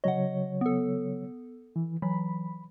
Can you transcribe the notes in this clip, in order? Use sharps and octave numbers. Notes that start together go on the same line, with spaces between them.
C#3 F#3 C#5 D#5 F#5
B3 A4
E3
E3 F#3 B5